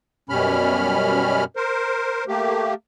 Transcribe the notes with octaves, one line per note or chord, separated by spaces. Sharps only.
F#2 B2 G3 C#4 B5 F6
A#4 C5
A3 A#3 G4